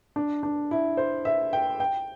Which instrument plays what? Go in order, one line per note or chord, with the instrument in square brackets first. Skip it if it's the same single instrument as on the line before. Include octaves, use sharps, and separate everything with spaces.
[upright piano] D4
D4
E4
C5
E5
G5
G5